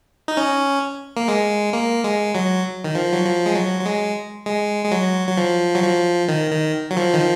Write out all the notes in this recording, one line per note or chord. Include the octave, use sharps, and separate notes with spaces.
D#4
C#4
A#3
G#3
A#3
G#3
F#3
D#3
F3
F#3
F3
G#3
F#3
F#3
G#3
G#3
G#3
F#3
F#3
F3
F#3
F3
D#3
D#3
F#3
F3
D#3
F3